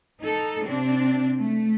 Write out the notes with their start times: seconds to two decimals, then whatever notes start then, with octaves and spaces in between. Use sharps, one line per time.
0.21 D#4 A4
0.65 C3 C4 D4
1.39 A3